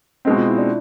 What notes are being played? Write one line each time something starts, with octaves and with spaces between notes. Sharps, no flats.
B2 G#3 C4 D#4
F4
E4
D4